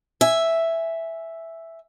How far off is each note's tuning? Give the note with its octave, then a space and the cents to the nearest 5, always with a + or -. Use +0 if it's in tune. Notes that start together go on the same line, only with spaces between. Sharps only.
E5 +0 G#5 +0